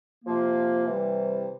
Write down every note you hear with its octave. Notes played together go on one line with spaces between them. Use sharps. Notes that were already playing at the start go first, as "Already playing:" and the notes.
C3 F3 A#3
C3 E3 G3